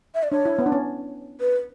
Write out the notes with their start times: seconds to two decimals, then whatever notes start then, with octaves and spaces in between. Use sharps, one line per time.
0.15 E5
0.23 D5
0.32 D4 C#5
0.45 E4
0.59 B3
0.66 D4
0.72 C#4
1.40 B4